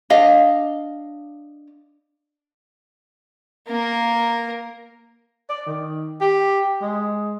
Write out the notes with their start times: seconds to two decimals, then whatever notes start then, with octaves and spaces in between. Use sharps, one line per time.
0.10 D4 D#5 F5
3.68 A#3 A#4
5.50 D5
5.67 D#3
6.21 G4
6.82 G#3